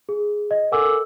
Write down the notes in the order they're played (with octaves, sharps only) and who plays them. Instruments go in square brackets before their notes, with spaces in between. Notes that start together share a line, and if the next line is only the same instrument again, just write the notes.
[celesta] G#4
D#5
A4 A#4 F#5 G#5 D6 E6